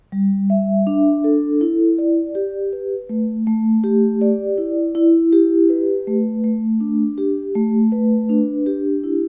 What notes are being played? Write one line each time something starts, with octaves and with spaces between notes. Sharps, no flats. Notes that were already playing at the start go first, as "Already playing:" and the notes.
G3
E5
D4
A4
E4
D5
G4
B4
A3
A3
G4
D5
E4
E4
G4
B4
A3
A3
D4
G4
A3
B4
D4
G4
E4